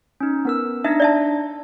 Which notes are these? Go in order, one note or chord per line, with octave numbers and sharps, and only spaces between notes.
C#4 D#4
B3 A#4 E6
D4 D#4 E5 A#6
D5 E5 A5